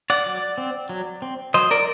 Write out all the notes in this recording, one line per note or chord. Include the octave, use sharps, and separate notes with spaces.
D5 F#5
F#3
C4
F#3
C4
F#3 C5 D#5
A#4 D5